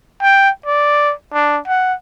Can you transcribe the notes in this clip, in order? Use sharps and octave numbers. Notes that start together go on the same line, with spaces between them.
G5
D5
D4
F#5